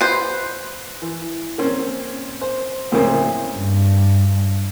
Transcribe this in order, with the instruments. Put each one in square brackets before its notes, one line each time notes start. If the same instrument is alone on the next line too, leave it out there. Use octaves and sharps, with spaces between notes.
[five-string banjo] B4 C5
[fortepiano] E3
A#3 C4 C#4
C5
D2 A2 C#3 A#3 C4 C#4
[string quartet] G2